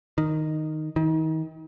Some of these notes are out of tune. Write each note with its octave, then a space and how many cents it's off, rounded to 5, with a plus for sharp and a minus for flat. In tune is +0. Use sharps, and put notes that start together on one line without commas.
D#3 -5
D#3 +35